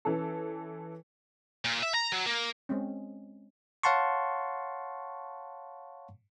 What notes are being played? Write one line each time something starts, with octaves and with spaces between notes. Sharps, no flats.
E3 C#4 A4
A#2
E5
A#5
F#3
A#3
G#3 C4 C#4
C#5 F5 F#5 A5 C6 C#6